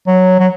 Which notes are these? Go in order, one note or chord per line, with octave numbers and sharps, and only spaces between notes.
F#3
F#3